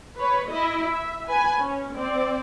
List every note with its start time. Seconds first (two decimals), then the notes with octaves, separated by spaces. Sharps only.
0.17 B4 C#5
0.50 E4 D#5
0.88 E5
1.28 B4 G#5
1.59 C#4
1.94 C4 D5